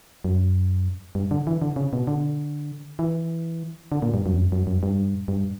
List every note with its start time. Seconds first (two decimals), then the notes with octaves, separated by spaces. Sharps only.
0.25 F#2
1.15 G2
1.31 D3
1.47 E3
1.62 D3
1.76 C#3
1.93 B2
2.07 D3
2.99 E3
3.92 D3
4.02 A#2
4.14 G2
4.26 F#2
4.33 E2
4.37 F#2
4.52 F#2
4.67 F#2
4.83 G2
5.28 G2